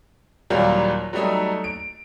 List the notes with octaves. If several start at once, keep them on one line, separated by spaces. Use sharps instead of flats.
D#2 A#2 F#3 G3 A#3
F#3 G3 A3 D#4
D7